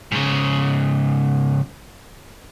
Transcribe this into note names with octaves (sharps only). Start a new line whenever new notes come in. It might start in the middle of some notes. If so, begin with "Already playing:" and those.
G#2 C#3